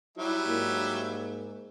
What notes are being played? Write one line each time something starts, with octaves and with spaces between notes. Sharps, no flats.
F#3 G3 E4 E5
G#2 A#3